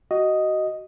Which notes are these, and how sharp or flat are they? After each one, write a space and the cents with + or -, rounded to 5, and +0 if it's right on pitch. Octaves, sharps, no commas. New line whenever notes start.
F#4 +25 D#5 +0